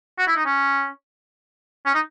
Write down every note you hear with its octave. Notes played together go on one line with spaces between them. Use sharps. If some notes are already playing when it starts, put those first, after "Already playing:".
F#4
E4
D#4
C#4
C#4
D#4